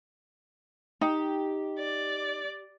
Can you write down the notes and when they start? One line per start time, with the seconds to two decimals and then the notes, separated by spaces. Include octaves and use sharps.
1.01 D#4 G4
1.78 D5